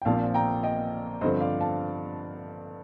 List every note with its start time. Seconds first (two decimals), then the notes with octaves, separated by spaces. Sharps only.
0.02 G5
0.05 A#1 A#2 F3 C4 F5 A5
0.34 G5 A#5
0.63 D#5 G5
1.21 G2 D3 F3 C4 C5 D#5
1.41 D5 F5
1.60 F5 A5